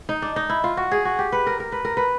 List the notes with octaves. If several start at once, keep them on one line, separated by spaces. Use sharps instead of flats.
D#4
D4
D#4
E4
F4
F#4
G#4
F#4
G4
B4
A#4
A#4
B4
A#4
B4